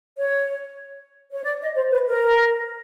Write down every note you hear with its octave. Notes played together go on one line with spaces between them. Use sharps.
C#5
C#5
D5
D#5
C5
B4
A#4